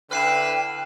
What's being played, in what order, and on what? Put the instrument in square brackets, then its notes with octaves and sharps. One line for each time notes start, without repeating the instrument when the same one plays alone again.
[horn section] D3 E4 B4 [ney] G5 [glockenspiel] F6 C7 E7